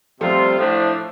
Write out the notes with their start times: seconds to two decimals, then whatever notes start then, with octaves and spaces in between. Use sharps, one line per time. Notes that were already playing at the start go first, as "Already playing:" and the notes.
0.21 C3 F3 G3 A3 C4 F4
0.58 A2 F3 D4